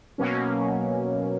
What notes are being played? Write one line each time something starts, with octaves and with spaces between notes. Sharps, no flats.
B2 F#3 A#3 C#4